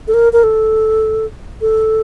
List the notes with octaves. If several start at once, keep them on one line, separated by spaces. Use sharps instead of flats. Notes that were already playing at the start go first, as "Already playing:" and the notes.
A4
A#4
A#4
A4
A4